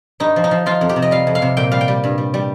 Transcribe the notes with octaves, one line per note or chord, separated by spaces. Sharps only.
G2 D#4
F3
D#4
F3
F3 F4
F2
G4
C3
D#5
G3 F5
F2
F5
C3
A#2 G5
G3 F5
G5
G3
G2
G3
G3